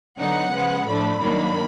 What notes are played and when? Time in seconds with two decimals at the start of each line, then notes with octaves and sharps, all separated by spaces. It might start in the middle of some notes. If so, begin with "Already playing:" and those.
0.19 D3 F#3 B3 D#4 F#5
0.52 C#3 F3 G#3 B3
0.87 A2 F3 A3 D4 B5
1.21 G2 D#3 F#3 A#3 D4